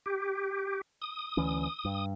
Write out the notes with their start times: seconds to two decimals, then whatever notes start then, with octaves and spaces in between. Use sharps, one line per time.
0.06 G4
1.02 D#6
1.37 D2 E3 C#4
1.85 G2